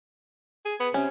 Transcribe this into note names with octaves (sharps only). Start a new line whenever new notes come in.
G#4
B3
C3 C#4